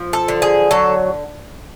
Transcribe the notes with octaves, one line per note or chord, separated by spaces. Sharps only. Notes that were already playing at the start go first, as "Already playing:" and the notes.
Already playing: F3
A4
D3
G#4
F#3 A4